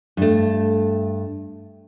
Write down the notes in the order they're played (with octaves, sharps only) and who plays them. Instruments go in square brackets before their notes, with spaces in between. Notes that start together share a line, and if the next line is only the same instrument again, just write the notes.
[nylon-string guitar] G2 A3